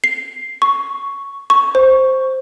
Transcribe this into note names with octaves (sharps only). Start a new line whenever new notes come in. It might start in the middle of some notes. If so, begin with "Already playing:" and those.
C7
C#6
C#6
C5